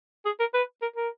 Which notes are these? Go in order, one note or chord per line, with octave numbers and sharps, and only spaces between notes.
G#4
A#4
B4
A#4
A#4